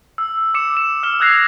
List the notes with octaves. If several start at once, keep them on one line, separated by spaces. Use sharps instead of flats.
E6
D6 C#7 E7
E7
E6 F6 E7 G7
D#6 F#6 G#6 A#6 C7 F7